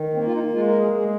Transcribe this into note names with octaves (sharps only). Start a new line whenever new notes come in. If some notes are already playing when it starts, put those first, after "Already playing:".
Already playing: D#3
A#3 C4
F4
D#4
G#3 F4
A#4
G#4
G#3 G#4